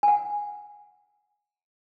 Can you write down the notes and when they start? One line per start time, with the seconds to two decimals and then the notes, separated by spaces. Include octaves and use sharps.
0.03 G#5
0.08 F#5